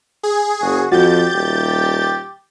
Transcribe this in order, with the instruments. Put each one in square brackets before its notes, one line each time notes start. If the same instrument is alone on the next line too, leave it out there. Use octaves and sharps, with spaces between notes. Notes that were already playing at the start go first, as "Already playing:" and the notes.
[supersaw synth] G#4
[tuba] F#1 [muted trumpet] F#4
[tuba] F2 [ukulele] F#4 [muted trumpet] G4 [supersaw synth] G6 A6
[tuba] D#1 [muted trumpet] G4